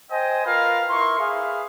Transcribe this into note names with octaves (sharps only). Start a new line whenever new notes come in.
C5 D#5 G5 G#5
F4 A#4 B4 F5
E4 A#4 C6 C#6
G#4 B4 E5 F5